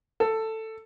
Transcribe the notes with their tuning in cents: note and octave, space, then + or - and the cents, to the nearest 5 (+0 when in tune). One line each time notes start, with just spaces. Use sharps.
A4 +10